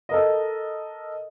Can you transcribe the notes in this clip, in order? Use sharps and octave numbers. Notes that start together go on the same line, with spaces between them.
A4 A#4 D#5